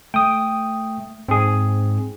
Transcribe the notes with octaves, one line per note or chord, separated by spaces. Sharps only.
A3 G5 D#6
G#2 C4 G#4